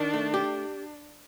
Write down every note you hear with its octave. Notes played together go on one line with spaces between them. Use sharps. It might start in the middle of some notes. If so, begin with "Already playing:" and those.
Already playing: D#3 D4
A3
G4